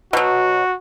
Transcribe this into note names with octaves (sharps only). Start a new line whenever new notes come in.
B2 F#3 F#4